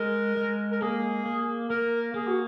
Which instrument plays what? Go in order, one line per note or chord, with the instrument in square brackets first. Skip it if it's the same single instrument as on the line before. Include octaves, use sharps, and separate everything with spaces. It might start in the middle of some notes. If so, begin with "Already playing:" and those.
Already playing: [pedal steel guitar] G#3 [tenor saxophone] A#4
[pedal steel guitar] G#3
[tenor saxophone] A#4
[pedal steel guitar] A#3 [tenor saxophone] G#4
[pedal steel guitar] A#3
[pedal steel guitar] A#3 [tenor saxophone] A#4
[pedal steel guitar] A#3 [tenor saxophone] G#4
[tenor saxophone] F#4